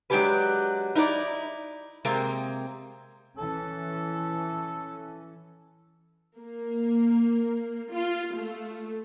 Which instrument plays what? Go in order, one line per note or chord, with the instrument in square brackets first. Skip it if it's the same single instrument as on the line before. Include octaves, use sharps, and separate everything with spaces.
[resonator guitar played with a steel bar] F#3 G#3 D4 G4 G#4 B4
D#4 E4 A#4 D5
C3 G#3 A#3 C4
[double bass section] E3 C#4 [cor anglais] A4
[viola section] A#3
F4
A3